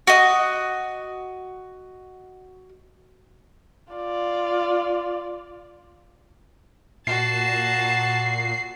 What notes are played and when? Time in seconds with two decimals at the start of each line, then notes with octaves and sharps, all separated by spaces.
0.07 F#4 D#5
3.93 F4 D5
7.07 A#2 F#4 A5 C7